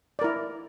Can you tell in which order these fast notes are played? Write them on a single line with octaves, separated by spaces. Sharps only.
D5 A#4 E4